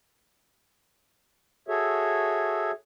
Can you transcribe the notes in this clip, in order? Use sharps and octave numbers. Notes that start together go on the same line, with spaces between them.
F#4 G#4 A4 C#5 E5